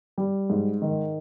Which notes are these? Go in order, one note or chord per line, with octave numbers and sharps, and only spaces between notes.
G3
G#2
D#3